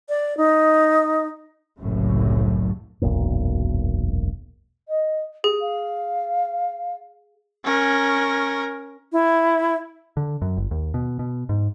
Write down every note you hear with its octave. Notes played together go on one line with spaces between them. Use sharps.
D5
D#4
F#1 C2 F#2 A2
E1 B1 F#2 A#2
D#5
G4 G#4
F5
C#4 A#4
E4
D3
F#2
G1
D#2
B2
B2
G#2